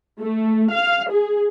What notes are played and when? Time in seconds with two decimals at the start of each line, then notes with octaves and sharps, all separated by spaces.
0.20 A3
0.71 F5
1.10 G#4